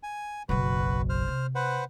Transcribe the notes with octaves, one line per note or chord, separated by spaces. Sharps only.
G#5
F#1 B1 F#4 B4
C5 F6
C3
B4 C5 F#5